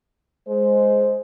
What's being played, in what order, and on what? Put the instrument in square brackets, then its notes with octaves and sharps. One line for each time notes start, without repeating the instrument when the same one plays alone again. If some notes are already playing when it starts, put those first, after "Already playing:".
[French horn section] G#3 C5